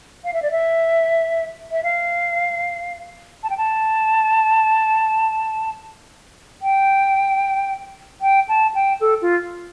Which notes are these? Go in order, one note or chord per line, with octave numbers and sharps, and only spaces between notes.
F5
E5
D5
E5
E5
F5
A5
G5
A5
G5
G5
A5
G5
A4
F4